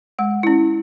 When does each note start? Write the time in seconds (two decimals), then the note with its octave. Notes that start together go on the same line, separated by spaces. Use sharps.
0.19 G#3 F#5
0.43 C#4 E4